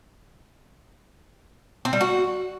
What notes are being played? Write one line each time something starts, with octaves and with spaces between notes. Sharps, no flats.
C4
G3
F#4